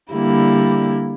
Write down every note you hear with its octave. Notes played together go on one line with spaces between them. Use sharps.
D3 G3 A#3 E4